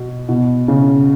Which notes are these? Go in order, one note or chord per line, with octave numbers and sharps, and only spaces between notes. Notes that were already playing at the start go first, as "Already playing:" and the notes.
Already playing: B2
B2
C#3